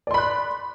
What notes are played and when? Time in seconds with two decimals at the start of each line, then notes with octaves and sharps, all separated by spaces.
0.07 D5
0.11 C6
0.14 B5
0.18 F#6